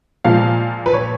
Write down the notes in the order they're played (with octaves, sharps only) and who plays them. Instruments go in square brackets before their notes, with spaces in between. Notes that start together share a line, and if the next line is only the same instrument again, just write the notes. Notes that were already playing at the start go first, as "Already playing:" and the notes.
[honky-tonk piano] A#2 F3 G#3 F5
B4
C#5